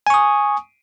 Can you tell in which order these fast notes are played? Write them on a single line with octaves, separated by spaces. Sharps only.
G#5 C#6 D#6